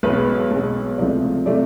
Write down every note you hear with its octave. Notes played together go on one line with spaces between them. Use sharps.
B1 B2 G#3 B4
B1 B2 G#3
C#2 C3 F3 A3 D5
C3 F3 A3 D5